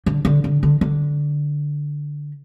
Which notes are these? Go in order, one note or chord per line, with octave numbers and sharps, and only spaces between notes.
D3
D3
D3
D3
D3